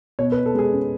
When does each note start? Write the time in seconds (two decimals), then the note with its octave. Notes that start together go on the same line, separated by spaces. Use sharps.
0.19 B2 C#5
0.32 B4
0.37 B2
0.46 A4
0.55 G#3 G#4
0.72 C#4